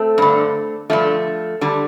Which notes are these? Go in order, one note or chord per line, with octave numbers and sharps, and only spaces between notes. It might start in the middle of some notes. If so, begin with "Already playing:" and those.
Already playing: A3 C4
G2 D3
G2 D3 F3 A3
D3 G3